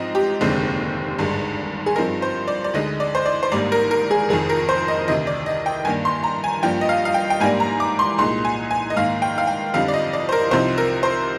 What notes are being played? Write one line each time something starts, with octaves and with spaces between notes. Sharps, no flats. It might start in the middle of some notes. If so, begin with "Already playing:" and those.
Already playing: G#2 F3 C4 D#4 D#5
G4
F1 D#2 D3 G#3 C4
G#1 G2 D3 G#3
G#4
G2 F3 C4 D#4 A#4
C5
D5
D5
D2 D3 G#3 D#4 D#5
D5
C5
D5
C5
G#1 G#2 G3 A#3 D4 D5
A#4
A#4
G#4
F1 F2 D#3 G#4
A#4
C5
D#5
D2 C3 D#3 D#5
D5
D#5
G5
G2 D#3 A#3 D4 G#5
C6
A#5
G#5
G2 F3 A#3 D4 G5
D#5
F5
F5
G5
G5
G#2 G3 A#3 D4 G#5
A#5
D6
C6
C2 A#2 G#3 D#4 C6
G#5
G#5
D#5
G#2 D#3 A#3 D#4 F5
G5
F5
G5
F2 D3 G3 C4 D#4 F5
D5
D#5
D5
C5
A#4
C2 C3 F3 C4 D#4 C5
A#4
C5